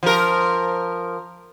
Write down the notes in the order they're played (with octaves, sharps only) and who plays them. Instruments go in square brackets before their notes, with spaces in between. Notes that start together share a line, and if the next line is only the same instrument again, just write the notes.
[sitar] F3 A#4